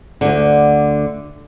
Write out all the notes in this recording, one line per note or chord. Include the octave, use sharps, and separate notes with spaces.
D2 D3